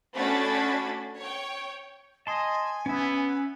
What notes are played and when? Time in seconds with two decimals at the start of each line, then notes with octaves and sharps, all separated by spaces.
0.15 A3 C#4 D4 F#4 B5 A6
1.18 C#5 G5
2.27 D#5 G#5 A5 C6
2.86 B3 C#4 E5